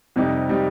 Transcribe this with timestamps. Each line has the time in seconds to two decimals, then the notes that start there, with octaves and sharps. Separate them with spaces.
0.16 F2 C3 G3 D#4 G4
0.49 C3 G3 D#4 G4